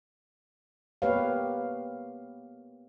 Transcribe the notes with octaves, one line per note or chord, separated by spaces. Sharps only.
A#3 B3 G4 B4 C#5 F5